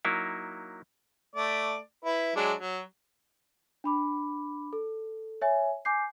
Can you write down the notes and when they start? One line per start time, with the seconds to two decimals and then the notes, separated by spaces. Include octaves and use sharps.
0.05 F#3 A#3 D#4 E4
1.36 A3 D5
2.05 E4 B4
2.36 F#3 G#3 D4
2.58 F#3
3.84 D4 B5 D6
4.73 A4
5.41 C#5 E5 G#5
5.85 G#5 D6 G6 C7